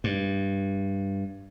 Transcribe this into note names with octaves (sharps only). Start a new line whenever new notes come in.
G2